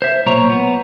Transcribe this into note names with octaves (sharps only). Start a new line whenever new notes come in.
C5 E5
B1 A#2 C#5 A#5
B3